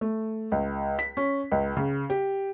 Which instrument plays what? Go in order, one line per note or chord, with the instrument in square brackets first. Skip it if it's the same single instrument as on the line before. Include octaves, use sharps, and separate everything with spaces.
[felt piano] A3
C#2
B6
C#4
C#2
C#3
G4